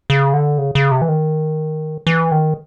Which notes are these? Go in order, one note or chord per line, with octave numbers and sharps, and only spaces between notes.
C#3
D3
C#3
C#3
C3
E3
D#3
E3
D#3